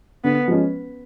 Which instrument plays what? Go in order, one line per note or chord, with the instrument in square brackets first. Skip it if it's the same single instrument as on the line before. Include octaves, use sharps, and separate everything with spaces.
[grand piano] D3 [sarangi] B3
[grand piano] F3 G#3 C#4